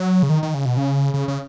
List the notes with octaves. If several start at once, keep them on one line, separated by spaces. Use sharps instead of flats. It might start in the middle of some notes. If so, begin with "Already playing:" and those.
Already playing: F#3
C#3
D#3
D#3
C#3
B2
C#3
C#3
C#3